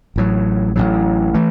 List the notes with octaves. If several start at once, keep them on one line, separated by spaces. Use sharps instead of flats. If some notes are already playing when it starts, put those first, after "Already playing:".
A1 A2 F#3
A1 A2 F#3
E3 A3